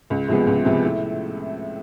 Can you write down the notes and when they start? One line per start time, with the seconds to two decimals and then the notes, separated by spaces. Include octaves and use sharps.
0.10 C#2
0.28 C3 F3 G#3 B3
0.47 C#2
0.64 C3 F3 G#3 B3
0.84 A2